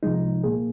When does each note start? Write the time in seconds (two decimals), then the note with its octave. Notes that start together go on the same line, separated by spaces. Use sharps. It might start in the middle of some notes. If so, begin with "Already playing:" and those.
0.03 C2 C3 F3 G#3 D#4
0.44 A#2 A#3 G#4